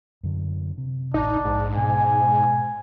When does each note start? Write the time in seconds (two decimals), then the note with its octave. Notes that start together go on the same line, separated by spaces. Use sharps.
0.23 F#2 D3
0.78 C3
1.14 D#1 A1 D4 D#4
1.45 A#1 G#2
1.77 B2 G#5